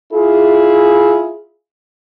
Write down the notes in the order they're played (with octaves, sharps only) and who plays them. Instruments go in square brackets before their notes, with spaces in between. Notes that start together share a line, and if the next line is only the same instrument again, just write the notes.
[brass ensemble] E4 F4 G#4